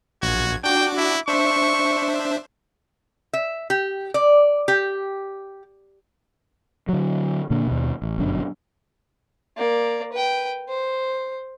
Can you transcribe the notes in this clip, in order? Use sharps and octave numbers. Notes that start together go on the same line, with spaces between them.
A#1 F#4 G#6
D4 F#4 G5 D6
E4
D4 C5 E5 C#6
E5
G4
D5
G4
D3 F#3
A#2 D3 A#3 D4
D#2 B2
A1
G1 F#2 B2 D4
A#3 D5
B4 G5
C5